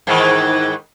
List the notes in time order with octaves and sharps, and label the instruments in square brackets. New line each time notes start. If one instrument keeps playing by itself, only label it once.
[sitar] G#2 D#3 E3